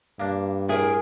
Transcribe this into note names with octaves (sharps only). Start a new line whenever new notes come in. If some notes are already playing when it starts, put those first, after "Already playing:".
G2 A#3 D4
A2 G#4 A#4